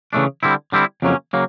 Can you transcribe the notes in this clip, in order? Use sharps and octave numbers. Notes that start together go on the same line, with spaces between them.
C#3 E3 A3 D4
D3 G3 C4 E4
D3 G3 C4 E4
F2 C#3 F#3 A#3 C#4
C#3 F#3 A#3